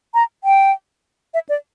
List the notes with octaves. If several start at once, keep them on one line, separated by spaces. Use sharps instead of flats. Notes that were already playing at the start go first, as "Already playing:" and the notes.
A#5
G5
E5
D5